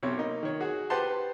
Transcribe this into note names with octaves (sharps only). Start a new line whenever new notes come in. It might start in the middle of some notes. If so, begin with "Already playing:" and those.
B1 C3 C#5
A#3 D#4
D#3 C#5
F#4 G#4
G4 B4 C5 F#5 A5 C6